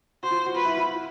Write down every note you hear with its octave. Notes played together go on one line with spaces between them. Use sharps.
F#4 C5
F4
F#4
F4 B4
E4
F4
E4